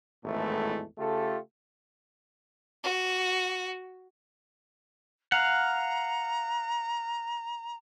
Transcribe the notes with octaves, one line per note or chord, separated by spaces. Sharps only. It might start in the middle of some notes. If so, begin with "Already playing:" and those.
G#1 E2 A2 E3 G#3 A3
C#3 A3 F4 G4 A4
F#4
F5 F#5 A#5